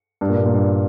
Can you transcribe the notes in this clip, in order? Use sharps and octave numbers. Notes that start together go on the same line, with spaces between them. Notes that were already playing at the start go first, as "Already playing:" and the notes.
G2
A#2
G2
A#2
G2